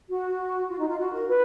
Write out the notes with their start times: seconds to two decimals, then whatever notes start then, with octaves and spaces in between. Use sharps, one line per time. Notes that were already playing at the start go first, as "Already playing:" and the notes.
0.09 F#4
0.69 F4
0.78 D#4
0.89 F4
0.98 F#4
1.13 A#4
1.27 B4